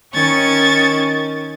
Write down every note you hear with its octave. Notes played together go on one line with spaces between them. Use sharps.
D#3 C#4 C#6 G#6 A6